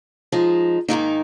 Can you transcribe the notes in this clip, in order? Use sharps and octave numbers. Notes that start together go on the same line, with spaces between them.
F3 G#3 D#4
G#2 D#3 A#3 D#4